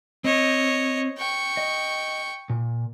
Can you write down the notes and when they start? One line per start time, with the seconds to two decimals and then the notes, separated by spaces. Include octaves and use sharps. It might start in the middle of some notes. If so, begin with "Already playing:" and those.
0.24 C4 C#5 D#5
1.18 G5 C#6
1.57 D#5
2.50 A#2